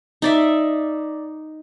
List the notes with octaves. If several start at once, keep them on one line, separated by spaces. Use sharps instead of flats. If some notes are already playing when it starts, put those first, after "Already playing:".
D#4 D5 E5